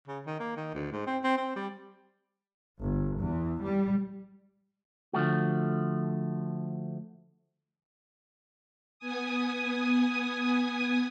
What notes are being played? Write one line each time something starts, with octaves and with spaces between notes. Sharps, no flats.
C#3
D#3
A#3
D#3
D2
G#2
C4
C4
C4
G3
G1
E2
G3
D3 F3 A3 F#4
B3 G#5 D#6